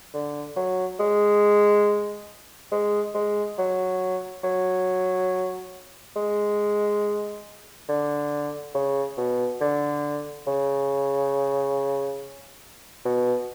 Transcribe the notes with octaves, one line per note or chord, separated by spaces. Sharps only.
D3
F#3
G#3
G#3
G#3
F#3
F#3
G#3
D3
C#3
B2
D3
C#3
B2